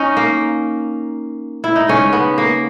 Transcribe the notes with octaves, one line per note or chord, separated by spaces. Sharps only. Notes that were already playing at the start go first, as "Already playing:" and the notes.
Already playing: C#4 D#4
A#3
E4
D#4
C#3 G#3 C#4
B3
A#3